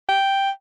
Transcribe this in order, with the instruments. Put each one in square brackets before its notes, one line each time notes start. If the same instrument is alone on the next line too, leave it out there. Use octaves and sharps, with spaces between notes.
[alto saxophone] G5